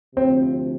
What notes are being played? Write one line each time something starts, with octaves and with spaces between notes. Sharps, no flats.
D2 C3 F3 C4